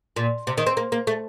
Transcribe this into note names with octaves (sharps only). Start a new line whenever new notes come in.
A#2
C3
D#3
C4
A#3
A#3
A3